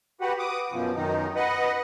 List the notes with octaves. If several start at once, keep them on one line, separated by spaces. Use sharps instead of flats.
F#4 G4 B4 F#5
D6 D#6
F#2 B2 F3
F#2 D#3 D#4
B4 D#5 F#5